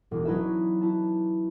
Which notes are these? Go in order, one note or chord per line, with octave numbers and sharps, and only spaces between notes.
E1 D4 F#4
F#3 C#4 D#4 E4 B4 E5
E4 A5